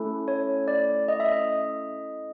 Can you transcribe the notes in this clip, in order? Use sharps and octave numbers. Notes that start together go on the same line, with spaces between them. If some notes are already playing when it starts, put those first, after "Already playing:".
Already playing: A3 C#4 E4 A4
C#5
D5
D#5
E5
D#5